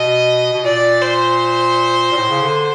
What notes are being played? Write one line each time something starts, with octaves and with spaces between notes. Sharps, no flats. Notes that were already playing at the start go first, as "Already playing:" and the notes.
Already playing: B2 D#5
B2
A#2 D5
C5
A#2
A2
C#3
D3